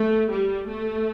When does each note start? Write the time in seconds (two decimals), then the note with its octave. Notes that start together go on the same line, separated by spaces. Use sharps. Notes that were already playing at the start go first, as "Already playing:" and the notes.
Already playing: A3
0.30 G3
0.69 A3